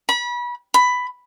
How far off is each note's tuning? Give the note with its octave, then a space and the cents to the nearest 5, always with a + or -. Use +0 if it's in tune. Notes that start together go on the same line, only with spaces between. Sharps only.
B5 -30
B5 +10